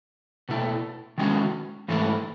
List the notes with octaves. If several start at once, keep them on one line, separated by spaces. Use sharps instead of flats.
B2 A3 E4
D#3 G#3 C#4 F#4
G#2 E3 A3 E4